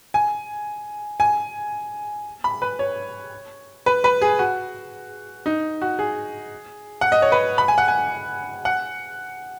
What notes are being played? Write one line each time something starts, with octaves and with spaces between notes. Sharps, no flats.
G#5
G#5
B5
B4
C#5
B4
B4
G#4
F#4
D#4
F#4
G#4
F#5
D#5
C#5
B4
B5
G#5
F#5
G#5
F#5